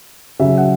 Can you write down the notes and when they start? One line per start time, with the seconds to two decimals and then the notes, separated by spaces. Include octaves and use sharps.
0.39 C#3 F#3 E5
0.58 F#5